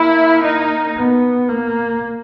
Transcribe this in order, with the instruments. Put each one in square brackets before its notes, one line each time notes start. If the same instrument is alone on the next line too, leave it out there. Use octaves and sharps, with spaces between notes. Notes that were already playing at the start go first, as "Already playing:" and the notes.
Already playing: [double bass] A#3 [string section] E4
[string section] D#4
[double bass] B3
A#3